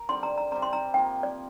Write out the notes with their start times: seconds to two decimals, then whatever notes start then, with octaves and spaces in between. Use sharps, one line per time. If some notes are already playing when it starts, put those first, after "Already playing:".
Already playing: A#4
0.09 D3 G3 C4 C6
0.23 A#5
0.38 A#5
0.51 C3 G3 C4 A#5
0.62 C6
0.73 A#5
0.94 C3 F3 A#3 G5
1.23 D5